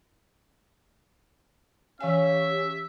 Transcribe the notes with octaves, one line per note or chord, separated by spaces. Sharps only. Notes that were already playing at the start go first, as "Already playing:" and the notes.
E3 C#4 G4 C#5 E5 F5 G#5